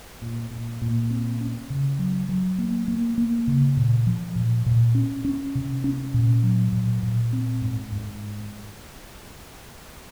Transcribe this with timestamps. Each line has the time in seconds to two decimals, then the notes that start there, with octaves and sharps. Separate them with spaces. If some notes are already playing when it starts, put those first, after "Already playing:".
0.22 A#2
0.51 A#2
0.82 A#2
1.10 C4
1.41 C#4
1.70 C#3
1.99 F#3
2.29 F#3
2.59 A#3
2.88 A#3
3.18 A#3
3.47 C#3
3.77 A#2
4.07 F3
4.36 A#2
4.66 A#2
4.95 C#4
5.25 C#4
5.55 C3
5.84 C#4
6.14 A#2
6.43 F#3
6.73 A#2
7.03 A#2
7.33 C4
7.62 G#2
7.92 G#2